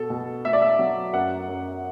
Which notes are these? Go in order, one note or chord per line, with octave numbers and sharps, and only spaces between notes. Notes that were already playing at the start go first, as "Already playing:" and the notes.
Already playing: B2 A4
B2
A3 E5
D5
E5
F#3
F#2 F#5
F#2